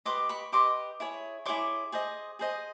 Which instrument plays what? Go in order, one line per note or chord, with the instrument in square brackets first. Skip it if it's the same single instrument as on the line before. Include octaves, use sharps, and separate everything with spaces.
[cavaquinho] G4 B4 D#5 C6 D6
B5 C#6
G4 B4 D#5 C6 D6
E4 G#4 C#5
E4 G#4 C#5 C6 D6
G#4 C5 D#5
G#4 C5 D#5